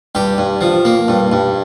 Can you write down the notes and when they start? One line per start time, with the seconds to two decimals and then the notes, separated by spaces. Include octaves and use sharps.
0.15 G2 G4
0.38 G2
0.61 F3
0.85 A#3
1.08 G2
1.32 G2